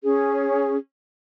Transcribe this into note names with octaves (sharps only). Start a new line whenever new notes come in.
C#4 G#4